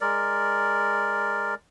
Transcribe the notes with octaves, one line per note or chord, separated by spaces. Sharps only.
G#3 A#4 D5